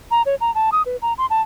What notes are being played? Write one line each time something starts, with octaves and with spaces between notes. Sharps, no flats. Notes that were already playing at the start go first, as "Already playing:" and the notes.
A#5
C#5
A#5
A5
D#6
B4
A#5
C6
A5